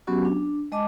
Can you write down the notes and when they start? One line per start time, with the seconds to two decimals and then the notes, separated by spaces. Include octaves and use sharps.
0.07 F#3 B3 C#4 F#4 G4
0.25 D4
0.72 G#3 D#5 A5 D6